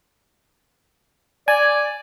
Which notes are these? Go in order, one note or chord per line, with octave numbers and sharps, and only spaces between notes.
D5 G#5